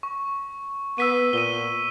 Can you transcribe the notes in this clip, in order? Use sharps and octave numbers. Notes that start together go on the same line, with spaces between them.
C#6
B3 E6 B6 D#7
A#2 D#7 G7